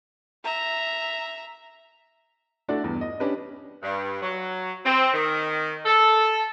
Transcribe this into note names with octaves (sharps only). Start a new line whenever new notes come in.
E5 A#5
A3 D4 E4 F#4 A4 D5
E2 G2
D#5
C#4 D4 G4 B4
G2
F#3
C4
D#3
A4